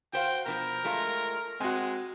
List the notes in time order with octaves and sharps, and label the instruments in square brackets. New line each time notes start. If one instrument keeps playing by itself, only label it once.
[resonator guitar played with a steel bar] F#4 C5 F5 [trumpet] G5
[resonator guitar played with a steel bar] B2 D#3 F3 [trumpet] A#4
[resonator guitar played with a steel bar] G#3 A3 F4
[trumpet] G#3 [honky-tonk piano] C4 F#4 [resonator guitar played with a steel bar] G#5